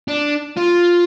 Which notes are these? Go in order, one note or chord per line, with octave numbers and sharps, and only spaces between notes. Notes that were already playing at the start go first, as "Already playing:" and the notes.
D4
F4